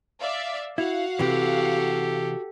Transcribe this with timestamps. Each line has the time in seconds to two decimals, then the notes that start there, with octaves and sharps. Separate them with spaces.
0.21 D5 E5 F5
0.78 E4 F#4 F5 F#5
1.19 C3 E3 G4 A4